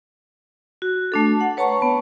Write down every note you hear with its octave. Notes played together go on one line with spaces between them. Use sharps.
F#4
A3 D4 A4
F#5
B4 C#5 A5 A#5 C#6
B3